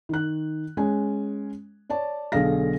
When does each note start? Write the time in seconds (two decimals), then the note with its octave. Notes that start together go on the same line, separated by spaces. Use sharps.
0.09 D#3 F#6
0.77 G#3 C#4 G#5
1.89 C#5 D5 A5
2.32 B1 D3 G#4 A4 F5 A#6